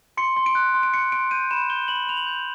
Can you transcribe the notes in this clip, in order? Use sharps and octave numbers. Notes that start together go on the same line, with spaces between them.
C6 C#7
C6
D7
F#6
C6
D7
C6 C#7
C6 D7
G6 D#7
B5 E7
G6 G7
B5 F#7
B5 F7
F#7
G6